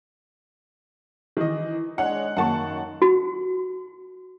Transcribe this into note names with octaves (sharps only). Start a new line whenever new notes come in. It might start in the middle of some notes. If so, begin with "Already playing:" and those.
D#3 E3 D#5
G#3 D4 C#5 D#5 F#5
F#2 D#3 A#3 F#5 A5 C#6
F#4